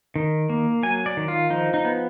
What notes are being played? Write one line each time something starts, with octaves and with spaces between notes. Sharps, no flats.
D#3
A#3
F#3 G#5
D5
D#3
F4
F3 D#4
D#4
B3